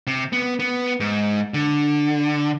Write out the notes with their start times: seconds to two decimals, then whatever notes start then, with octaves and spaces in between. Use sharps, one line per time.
0.07 C3
0.33 B3
0.60 B3
1.00 G#2
1.54 D3